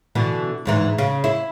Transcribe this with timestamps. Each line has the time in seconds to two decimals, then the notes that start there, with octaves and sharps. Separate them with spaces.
0.15 B2 D3 E3
0.65 D2 G#2 E3
0.98 C#3
1.24 E4